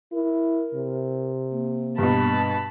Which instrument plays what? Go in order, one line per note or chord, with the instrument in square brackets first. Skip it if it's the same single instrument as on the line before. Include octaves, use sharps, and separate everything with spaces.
[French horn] E4 [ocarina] A#4
[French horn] C3
[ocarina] A#3
[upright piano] G2 B2 [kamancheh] A5 B5